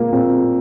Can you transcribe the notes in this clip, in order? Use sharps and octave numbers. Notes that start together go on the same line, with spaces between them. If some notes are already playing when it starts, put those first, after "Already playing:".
Already playing: A#2 G#3 A#3
A#2 C4